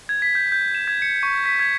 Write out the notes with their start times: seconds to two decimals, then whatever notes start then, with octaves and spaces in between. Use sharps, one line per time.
0.09 G#6
0.22 B6
0.35 G6
0.52 G6
0.75 E7
0.88 G#6
1.02 C#7
1.23 C#6
1.45 B6
1.60 G#6